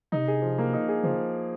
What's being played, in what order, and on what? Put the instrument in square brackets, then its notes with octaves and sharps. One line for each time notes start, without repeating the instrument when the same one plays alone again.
[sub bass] C3 [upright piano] D#4
[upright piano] G#4
F3
A#3
D#4
G#4
[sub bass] C#3 [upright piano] F3